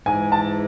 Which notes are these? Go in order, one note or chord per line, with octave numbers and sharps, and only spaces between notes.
G#2 E3 G#3 G#5
A5